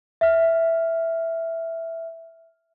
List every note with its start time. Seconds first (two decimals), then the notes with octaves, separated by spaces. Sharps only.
0.21 E5 F6